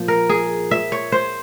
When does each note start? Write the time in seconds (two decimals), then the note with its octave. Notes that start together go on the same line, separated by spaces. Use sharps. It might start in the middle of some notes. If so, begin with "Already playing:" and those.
Already playing: A#2 F3
0.08 A#4
0.29 G#4
0.71 E5
0.92 C#5
1.12 C5